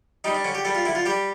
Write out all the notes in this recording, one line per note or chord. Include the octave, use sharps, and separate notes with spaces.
G3 D#4
D4
D3 C#4
G4
G3 A4
F4
D3 E4
F4
G3 G4